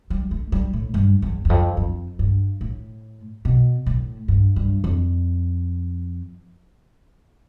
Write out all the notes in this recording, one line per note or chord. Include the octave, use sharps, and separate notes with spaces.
G3
A3
G3
A2
G2
E2
E2
F2
F2
G2
A2
B2
A2
G2
G2
F2